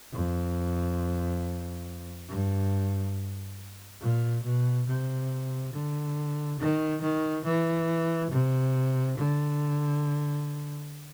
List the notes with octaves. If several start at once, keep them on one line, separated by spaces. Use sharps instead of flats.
F2
G2
A#2
B2
C3
D3
D#3
D#3
E3
C3
D3